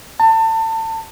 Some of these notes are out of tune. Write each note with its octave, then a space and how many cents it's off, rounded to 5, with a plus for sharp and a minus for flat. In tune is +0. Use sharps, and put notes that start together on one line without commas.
A5 +30